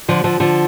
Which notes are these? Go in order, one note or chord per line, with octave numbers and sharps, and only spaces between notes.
D3 F3
D3 F3
D3 F3